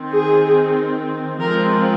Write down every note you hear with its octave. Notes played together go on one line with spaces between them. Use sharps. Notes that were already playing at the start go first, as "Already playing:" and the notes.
Already playing: D#3 C4
G#4
F3 G#3 C4 A#4